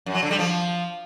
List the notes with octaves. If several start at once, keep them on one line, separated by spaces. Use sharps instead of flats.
F#2
F#3
D3
G3
F3